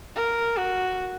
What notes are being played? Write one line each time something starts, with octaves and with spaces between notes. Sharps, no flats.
A#4
F#4